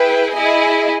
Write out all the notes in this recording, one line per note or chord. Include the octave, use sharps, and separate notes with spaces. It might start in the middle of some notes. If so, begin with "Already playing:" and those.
Already playing: E4 G#4 B4 G5
E4 G#4 D#5 G#5